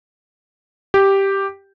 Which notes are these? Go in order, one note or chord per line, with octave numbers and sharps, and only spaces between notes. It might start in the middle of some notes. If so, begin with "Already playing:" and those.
G4